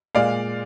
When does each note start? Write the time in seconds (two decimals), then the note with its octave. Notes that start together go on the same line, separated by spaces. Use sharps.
0.15 A#2 G#3 D5 F5